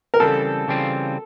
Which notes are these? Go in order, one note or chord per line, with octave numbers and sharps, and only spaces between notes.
A#4
C#3 E3 G3 C4 F4 A4
C#3 E3 G3 C4 F4